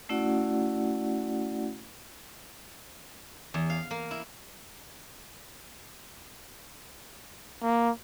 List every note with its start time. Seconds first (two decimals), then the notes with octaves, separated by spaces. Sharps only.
0.09 A3 C#4 E4 F#4 D5 F#5
3.54 E2
3.70 F5
3.91 A#3
4.11 E4
7.63 A#3